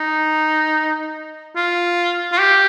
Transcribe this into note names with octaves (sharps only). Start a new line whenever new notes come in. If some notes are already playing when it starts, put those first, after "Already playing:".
Already playing: D#4
F4
F4
G4